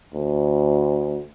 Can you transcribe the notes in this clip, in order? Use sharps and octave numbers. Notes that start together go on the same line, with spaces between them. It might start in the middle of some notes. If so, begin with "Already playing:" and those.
D2